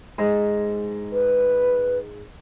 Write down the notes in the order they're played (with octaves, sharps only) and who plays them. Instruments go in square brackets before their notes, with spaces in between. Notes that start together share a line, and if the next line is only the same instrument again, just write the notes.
[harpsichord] G#2
[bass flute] B4